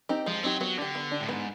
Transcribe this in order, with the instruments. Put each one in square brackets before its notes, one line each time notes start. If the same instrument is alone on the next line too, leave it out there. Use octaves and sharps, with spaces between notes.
[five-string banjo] C4 D#4 G4
[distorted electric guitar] F3 [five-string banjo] G#3
[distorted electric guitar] F#3 [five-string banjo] C4 D#4 G4
[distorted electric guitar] F#3 [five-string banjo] B3
[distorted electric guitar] D3 [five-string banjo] D4 G4
[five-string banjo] B3
D4 G4
[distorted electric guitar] A2
[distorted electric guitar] G#2 [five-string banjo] B3